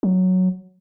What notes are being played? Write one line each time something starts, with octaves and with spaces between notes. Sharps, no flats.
F#3